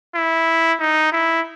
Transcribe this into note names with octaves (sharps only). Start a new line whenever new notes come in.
E4
D#4
E4